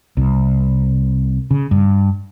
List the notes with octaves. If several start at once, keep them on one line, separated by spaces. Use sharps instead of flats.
C2
C#3
G2